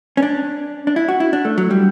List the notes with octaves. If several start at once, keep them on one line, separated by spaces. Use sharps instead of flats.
C#4
D4
D4
E4
F#4
E4
D4
A3
F#3
G3